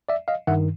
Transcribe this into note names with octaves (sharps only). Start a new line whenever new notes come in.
D5 E5
D#5 F5
G2 D#3 E5 F#5